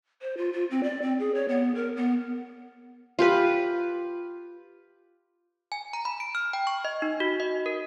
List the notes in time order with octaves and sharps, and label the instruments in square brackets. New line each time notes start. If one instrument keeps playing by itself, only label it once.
[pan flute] C5
F4
F4
C4
D5
C4
G#4
C#5
B3
A#4
B3
[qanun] F4 G4 B4
[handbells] G#5
A#5
B5
D7
F6
G5
C#6
D#5
D#4
F#4
D#5
A#4